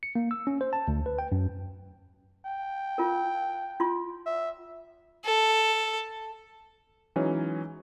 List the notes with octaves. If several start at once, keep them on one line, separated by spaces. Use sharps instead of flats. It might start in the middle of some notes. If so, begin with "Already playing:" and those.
C#7
A#3
E6
C#4
C5
A5
D2
B4
G5
F#2
G5
F4 A#4
F4 C6
E5
A4
E3 F#3 G#3 C#4 D#4